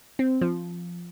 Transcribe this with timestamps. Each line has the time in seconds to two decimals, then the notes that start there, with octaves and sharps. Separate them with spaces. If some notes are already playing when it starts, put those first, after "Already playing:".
0.19 C4
0.41 F3